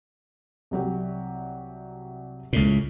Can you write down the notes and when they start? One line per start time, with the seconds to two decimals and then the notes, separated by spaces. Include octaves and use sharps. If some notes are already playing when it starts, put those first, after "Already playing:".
0.71 C2 F#3 G4
2.53 C#2 A2